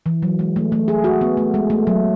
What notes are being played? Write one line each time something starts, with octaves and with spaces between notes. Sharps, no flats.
E3
F#3
G#3
A3
A3
G#4
F#4
B3
A3
G#3
A3
F#3